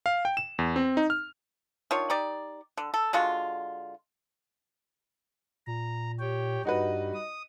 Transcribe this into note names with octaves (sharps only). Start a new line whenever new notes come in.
F5
G5
E7
E2
C4
D#4
F6
D#3 D4 F4 C#5
D#4 G4 D5
D3
A4
D3 G#3 F4 F#4
A#2 A#5
G4 C#5 G5
G2 G3 D#4 F#4 B4 D#5
D#6